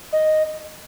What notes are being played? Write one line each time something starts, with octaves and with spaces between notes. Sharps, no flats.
D#5